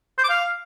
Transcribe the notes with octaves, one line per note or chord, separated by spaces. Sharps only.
C5
D6
F5